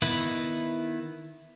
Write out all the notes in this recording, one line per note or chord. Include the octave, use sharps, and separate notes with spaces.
D#3 B3 E4 B4